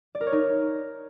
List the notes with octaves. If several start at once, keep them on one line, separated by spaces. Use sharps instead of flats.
D5
A#4
C#5
D#4